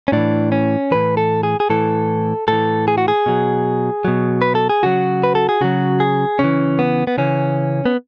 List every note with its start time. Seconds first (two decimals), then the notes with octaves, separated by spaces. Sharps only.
0.08 C#4
0.12 A2 E3 D4
0.52 C#4
0.91 A2 E3 B4
1.17 A4
1.43 G#4
1.60 G#4
1.70 A2 E3 A4
2.48 A2 E3 A4
2.88 G#4
2.98 F#4
3.08 G#4
3.26 B2 F#3
4.05 B2 F#3
4.42 B4
4.55 A4
4.69 G#4
4.83 C#3 F#3 F#4
5.23 B4
5.35 A4
5.49 G#4
5.61 C#3 F#3 F#4
6.00 G#4
6.39 C#3 E3 C#4
6.79 B3
7.07 B3
7.18 C#3 E3 C#4
7.86 B3